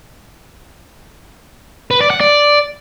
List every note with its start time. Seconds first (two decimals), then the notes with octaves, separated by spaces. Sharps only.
1.91 B4
2.01 D5
2.11 F#5
2.21 D5